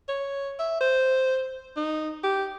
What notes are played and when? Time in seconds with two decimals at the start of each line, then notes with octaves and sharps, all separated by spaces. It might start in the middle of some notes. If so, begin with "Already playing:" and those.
0.09 C#5
0.59 E5
0.81 C5
1.77 D#4
2.23 G4